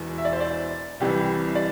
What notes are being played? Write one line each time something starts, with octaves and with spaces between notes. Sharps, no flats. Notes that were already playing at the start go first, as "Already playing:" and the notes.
Already playing: E1 E2 E3
E5
D5
C5
D5
C2 C3 E3 G3 G4
D5